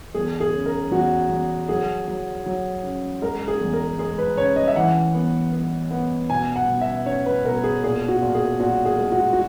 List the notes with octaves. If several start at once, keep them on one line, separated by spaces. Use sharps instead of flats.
E2 G#4
G#4
C#3
A#4
E2 F#4
E2
F#3 G#4
F#3
F#3
C#3
G#3 A#4
G#4
E2
A#4
G#3 G#4
B4
C#3 C#5
D#5
E5
E3 F#5
B3
B3
B3
B2 G#5
F#5
B2
E5
C#4 C#5
B4
B2 A#4
G#4
A#2 G#4
F#4
A#2
G#4
A#2 F#4
G#4
G#3
F#4
F#4